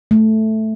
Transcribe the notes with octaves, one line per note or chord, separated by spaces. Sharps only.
A3